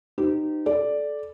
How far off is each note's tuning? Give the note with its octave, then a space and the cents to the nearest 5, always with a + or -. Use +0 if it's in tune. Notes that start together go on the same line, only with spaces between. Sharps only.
D#4 -20 G4 -25 C5 -35
A4 -20 D5 +0